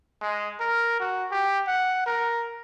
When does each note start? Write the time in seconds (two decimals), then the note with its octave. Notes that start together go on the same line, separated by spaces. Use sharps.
0.21 G#3
0.60 A#4
1.00 F#4
1.31 G4
1.67 F#5
2.06 A#4